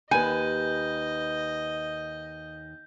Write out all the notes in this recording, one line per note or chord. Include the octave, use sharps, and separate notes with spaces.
D#2 B4 D#5 G#5 G6